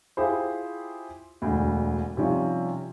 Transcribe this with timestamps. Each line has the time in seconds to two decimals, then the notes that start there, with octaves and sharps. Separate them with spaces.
0.17 E4 F4 G4 G#4 C5
1.42 E1 D2
2.17 C3 F3 G3 C#4 D#4 F4